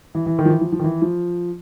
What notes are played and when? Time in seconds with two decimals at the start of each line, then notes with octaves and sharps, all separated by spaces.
0.15 E3
0.26 E3
0.39 D#3
0.45 F3
0.49 E3
0.61 F3
0.72 F3
0.79 D#3
0.84 E3
1.02 F3